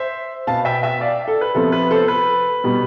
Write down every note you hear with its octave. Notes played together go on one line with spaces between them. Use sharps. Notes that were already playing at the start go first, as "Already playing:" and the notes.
Already playing: C5 E5
B2 B3 F5 A5
E5 G5
E5 G5
D5 F5
A4
B4
C3 F3 B3 A4
B4
A4 C5
B4
B2 G3 B3